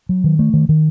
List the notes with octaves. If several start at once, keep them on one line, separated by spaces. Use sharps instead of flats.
F#3
D#3
A3
D#3
D#3